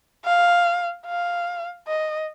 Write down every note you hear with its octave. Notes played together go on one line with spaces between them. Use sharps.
F5
F5
D#5